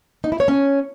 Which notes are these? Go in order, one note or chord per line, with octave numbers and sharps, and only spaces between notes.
D#4
E4
C#5
C#4